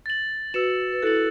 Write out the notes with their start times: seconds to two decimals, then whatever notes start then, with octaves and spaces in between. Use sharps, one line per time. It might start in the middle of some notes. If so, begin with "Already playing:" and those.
0.06 A6 F#7
0.54 F#4 B4 E6 C#7 E7
0.92 B4
1.02 E4 A4 F#6 A6 C#7 F#7